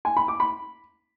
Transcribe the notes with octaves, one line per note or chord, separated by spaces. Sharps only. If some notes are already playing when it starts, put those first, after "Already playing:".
G#5
B5
D6
B5